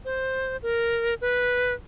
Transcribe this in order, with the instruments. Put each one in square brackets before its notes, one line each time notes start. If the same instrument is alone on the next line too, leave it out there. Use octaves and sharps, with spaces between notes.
[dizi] C5
A#4
B4